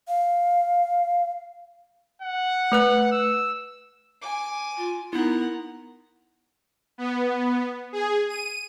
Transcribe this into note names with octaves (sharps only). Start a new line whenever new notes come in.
F5
F#5
A3 B4 F#6
E6
G#5 D6
F4
B3 D#4 E4 A#4 F#5
B3
G#4
D#7